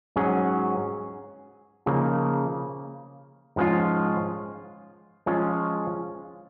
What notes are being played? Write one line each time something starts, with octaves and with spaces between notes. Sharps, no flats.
G#2 F#3 C#4 G#4
C#3 F3 A#3 D#4
G#2 F3 G#3 C#4 F4
F3 G#3 C#4 F4